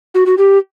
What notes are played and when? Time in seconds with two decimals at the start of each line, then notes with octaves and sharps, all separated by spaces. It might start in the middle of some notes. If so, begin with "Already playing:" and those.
0.14 F#4
0.26 F#4
0.38 G4